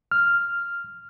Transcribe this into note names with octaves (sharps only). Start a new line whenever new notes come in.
F6